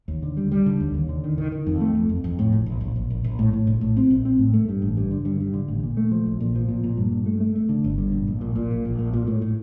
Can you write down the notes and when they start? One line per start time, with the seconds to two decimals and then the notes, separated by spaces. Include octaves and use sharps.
0.08 D#2
0.23 D3
0.37 G3
0.52 G3
0.66 D3
0.80 D#2
0.94 D#2
1.09 D3
1.24 D#3
1.38 D#3
1.52 D#3
1.67 F2
1.81 A3
1.95 F2
2.09 F2
2.24 F2
2.39 A2
2.53 A#1
2.66 A#1
2.81 A#1
2.96 A#1
3.10 A#1
3.24 A#1
3.39 A2
3.53 A2
3.67 A#1
3.81 A2
3.97 C4
4.10 A#1
4.25 C4
4.39 A2
4.54 A3
4.69 G2
4.82 A1
4.97 G2
5.11 D3
5.25 G2
5.40 G2
5.54 D3
5.68 A1
5.83 A#2
5.97 A3
6.12 F3
6.26 A#1
6.40 A#2
6.55 F3
6.68 A#2
6.84 A#2
6.97 G2
7.12 G2
7.26 A3
7.40 A3
7.55 A3
7.69 D3
7.84 G1
7.98 G2
8.12 A#1
8.28 A#1
8.41 A#2
8.56 A#2
8.71 A#1
8.85 A#1
8.99 A#2
9.14 A#2
9.27 A2
9.42 A2